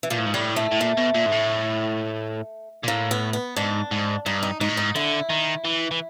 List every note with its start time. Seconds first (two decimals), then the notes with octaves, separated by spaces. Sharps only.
0.03 E3
0.10 A#2 F3
0.19 A2
0.27 G#2
0.34 A2 G3
0.56 A3
0.72 A2
0.80 A#2 A3
0.98 B2
1.15 A#2
1.27 G#2
1.32 A2
2.83 A#2
2.87 A2 A#3
3.11 B3
3.33 B3
3.56 G#2 D4
3.91 G#2
4.26 G2 D#4
4.43 D#4
4.60 G#2 D#4
4.69 A2
4.77 G#2 D#4
4.95 D3 E4
5.29 D#3
5.64 E3
5.91 E3